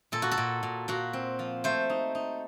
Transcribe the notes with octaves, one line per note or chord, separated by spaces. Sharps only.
A#2 A4
F#4
A4
A#2
A#2
A#2 F#4
C4
F3
A3 C5
D#4
D#4